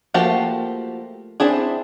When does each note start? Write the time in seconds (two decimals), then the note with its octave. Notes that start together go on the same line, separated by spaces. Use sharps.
0.14 F3 A3 A#3 F#4 G4
1.40 C4 D4 E4 G#4